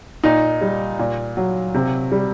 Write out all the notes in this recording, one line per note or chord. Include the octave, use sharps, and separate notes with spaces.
A#2 D#4
G3
A#2
F#3
C3
G3